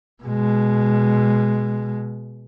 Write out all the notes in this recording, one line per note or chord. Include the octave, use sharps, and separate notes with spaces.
B2 G#3